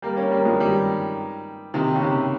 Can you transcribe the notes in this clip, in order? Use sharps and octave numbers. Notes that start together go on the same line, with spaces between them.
G3 A#3
A#3 C#4
G3 A#3
F3 G#3
D#3 G3
C3 D#3
C#3
C3